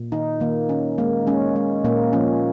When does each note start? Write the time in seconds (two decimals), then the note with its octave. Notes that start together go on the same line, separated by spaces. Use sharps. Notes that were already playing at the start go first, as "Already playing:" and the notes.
Already playing: A#2
0.12 D#3 D#4
0.40 D#3 A#3
0.69 D#3 C#4
0.98 G#3 A#3
1.27 G#3 C#4
1.56 G#3
1.84 A#2 A#3
2.13 F3 C#4